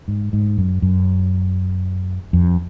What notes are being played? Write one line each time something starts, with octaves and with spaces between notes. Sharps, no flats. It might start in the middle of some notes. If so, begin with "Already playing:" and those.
G#2
G#2
F#2
F#2
F2